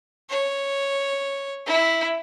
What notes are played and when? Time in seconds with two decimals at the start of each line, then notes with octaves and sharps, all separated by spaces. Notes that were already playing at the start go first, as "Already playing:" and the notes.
0.30 C#5
1.67 E4